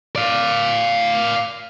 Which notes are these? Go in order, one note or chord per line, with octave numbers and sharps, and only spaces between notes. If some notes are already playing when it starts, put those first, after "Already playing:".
D5 F5